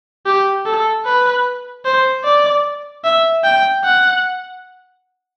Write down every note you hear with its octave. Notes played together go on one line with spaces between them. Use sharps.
G4
A4
B4
C5
D5
E5
G5
F#5